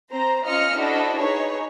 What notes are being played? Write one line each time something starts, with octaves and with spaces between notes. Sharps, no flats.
C4 C5 A#5
C#4 F4 D#5 F6 C#7
D4 E4 F#4 A4 C5 D#5
D#4 G#4 B4 C#5